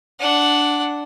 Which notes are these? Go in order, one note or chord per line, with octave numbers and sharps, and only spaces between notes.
D4 F#5